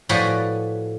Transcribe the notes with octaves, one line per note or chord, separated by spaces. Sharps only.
A2 F3 F#4 B4 D5 G#5